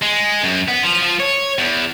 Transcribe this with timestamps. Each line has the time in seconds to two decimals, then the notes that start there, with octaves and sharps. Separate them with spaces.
0.02 G#3
0.44 F#2
0.68 B3
0.83 F3
1.02 F3
1.19 C#5
1.59 E2